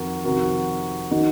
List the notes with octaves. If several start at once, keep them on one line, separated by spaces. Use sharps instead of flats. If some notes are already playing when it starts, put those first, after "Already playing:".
Already playing: F2 D#3 F#4 A#4
F2 C3 D#3 F#4 A#4
D#3 D#4 F#4